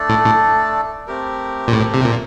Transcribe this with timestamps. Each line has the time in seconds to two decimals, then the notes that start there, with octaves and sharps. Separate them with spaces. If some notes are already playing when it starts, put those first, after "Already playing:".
Already playing: A3 D4 A4 D5
0.09 A2
0.26 A2
1.07 A3 C4 G4 A#4
1.68 A#2
1.73 A2
1.94 C3
2.05 A#2